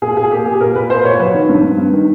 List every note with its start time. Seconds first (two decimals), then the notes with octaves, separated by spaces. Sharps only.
0.02 A#2 G#4
0.17 A#2 G#4
0.31 A#3 G4
0.46 A#2 G#4
0.61 A#2 A#4
0.75 A#2 B4
0.90 A#3 C5
1.05 A#2 C#5
1.19 F#3 B4
1.34 D#3
1.49 G2
1.64 G2
1.78 G2
1.93 D#3